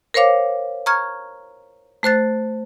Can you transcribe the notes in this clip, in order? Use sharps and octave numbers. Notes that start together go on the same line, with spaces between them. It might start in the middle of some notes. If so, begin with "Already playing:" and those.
A#4 C5 C#5 F5 D6
A#5 C#6 F6 G#6
A3 C5 F#6 A6